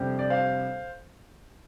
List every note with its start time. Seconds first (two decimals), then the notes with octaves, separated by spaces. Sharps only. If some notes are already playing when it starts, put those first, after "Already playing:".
Already playing: F2 C3 G3 D4 G4 C5
0.19 D5
0.30 C5 F5